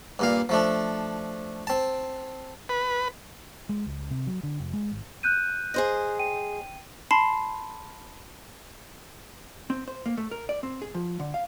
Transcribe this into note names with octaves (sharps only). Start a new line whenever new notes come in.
G2 A#2 F5
F3 A3 D4
C4 A5
B4
G#3
C#2
C3
F#3
D3
F1
G#3
G#1
F#6 G6 D#7
G#4 C5 D#5
G5 D#7
A5 B5 C6 C7
C4
C5
A#3
A3
A#4
D5
C4
G#4
F3
D3
F5